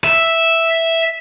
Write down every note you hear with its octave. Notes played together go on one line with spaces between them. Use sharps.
E5